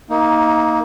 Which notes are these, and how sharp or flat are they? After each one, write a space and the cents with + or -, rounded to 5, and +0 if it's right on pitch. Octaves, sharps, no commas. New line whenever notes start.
A#3 +0 D#4 +20